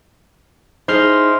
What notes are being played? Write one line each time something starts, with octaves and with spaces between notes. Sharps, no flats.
D#4 E4 G#4 C5 C6 F6